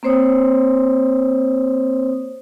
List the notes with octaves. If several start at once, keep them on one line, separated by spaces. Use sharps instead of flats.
A#3 C4 C5 C#5 D#6